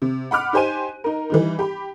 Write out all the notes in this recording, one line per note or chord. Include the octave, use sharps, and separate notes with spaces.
C3
F#5 B5 D6 F6 F#6
D#4 G4 C5 G#5 D#7
D#4 A#4
E3 G3 D#4
G4 B5